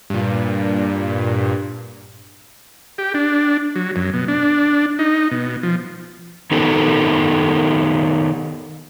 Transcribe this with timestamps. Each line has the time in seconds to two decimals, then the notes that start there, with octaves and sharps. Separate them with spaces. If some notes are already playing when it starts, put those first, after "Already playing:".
0.10 G2 A#2
2.98 G4
3.14 D4
3.76 F#3
3.96 F#2
4.14 B2
4.28 D4
4.99 D#4
5.31 B2
5.63 F3
6.51 D#3 B3 D#4 G4 A4 A#4